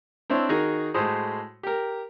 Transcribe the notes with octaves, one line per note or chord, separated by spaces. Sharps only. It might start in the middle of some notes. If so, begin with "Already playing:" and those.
C4 D4 E4 C5 C#5
D#3 D#4 F#4 G#4 A#4
A2 G#3 A3 F#4 C5 D#6
G4 A#4